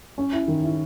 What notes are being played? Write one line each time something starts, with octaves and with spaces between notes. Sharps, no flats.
C#4
E4
D#3
E4